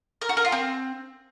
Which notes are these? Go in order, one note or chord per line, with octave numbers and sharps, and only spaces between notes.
A#4
F#4
A#4
F4
C4